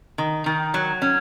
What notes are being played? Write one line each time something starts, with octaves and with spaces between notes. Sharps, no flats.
D#3
D#3
F#3
C#4